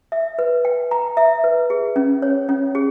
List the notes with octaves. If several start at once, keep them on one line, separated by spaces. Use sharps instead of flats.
E5
B4
G5
A#5
E5
B4
G#4
C#4
C#5
C#4
G#4